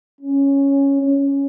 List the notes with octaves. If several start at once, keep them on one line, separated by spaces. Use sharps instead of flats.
C#4
C#4